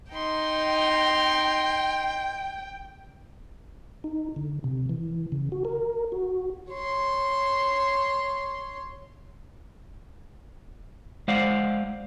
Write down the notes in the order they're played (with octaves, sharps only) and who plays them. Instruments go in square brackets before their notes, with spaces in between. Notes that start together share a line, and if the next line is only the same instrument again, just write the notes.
[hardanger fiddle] D#4 C6 [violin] G5
[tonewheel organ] D#4
D3
C3
E3
C#3
F#4
A#4
F#4
[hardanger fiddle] C#5 C6
[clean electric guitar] G#3 C5 D5 F5 F#5